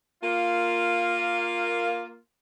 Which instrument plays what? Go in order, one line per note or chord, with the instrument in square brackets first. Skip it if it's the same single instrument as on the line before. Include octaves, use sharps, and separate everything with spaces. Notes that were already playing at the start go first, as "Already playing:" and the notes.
[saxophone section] A#3 F4